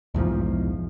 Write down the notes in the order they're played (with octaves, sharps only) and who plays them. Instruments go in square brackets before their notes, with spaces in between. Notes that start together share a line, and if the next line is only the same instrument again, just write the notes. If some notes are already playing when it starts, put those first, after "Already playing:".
[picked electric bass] B1 E2 G#2 F3